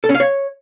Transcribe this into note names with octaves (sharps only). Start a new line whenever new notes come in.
A4
C#4
F5
C#5